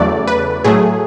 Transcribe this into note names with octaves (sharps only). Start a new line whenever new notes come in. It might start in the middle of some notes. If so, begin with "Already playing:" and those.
Already playing: E2 C#3 F#3 A3 D5
B4
A2 F#3 A3 G#4